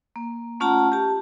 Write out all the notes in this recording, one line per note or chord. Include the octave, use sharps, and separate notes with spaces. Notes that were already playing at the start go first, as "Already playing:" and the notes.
A#3
A3 C#4 F4 F#5 A5 A#5
G4 A5